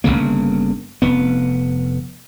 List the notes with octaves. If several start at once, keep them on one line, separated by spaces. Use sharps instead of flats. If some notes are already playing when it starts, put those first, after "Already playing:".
G1 E2 C#3 A#3
F1 B3